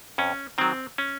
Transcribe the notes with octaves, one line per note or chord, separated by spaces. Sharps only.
F2 C#4
D#3 F#3 C4
C#4